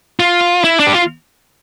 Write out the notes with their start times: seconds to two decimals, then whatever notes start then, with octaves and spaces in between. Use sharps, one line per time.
0.20 F4
0.64 E4
0.80 D4
0.87 G4
0.94 F4